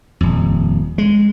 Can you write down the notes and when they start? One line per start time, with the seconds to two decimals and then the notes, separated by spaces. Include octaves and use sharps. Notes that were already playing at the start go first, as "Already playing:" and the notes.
0.21 D#1 F2
0.98 G#3